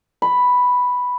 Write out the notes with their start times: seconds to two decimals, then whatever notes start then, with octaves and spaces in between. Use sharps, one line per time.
0.22 B5